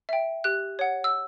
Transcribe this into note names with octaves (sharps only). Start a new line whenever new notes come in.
E5 G5
G4 F#6
C#5 F#5
E6